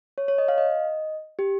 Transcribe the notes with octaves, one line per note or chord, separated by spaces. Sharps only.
C#5
C#5
D#5
F5
D#5
G4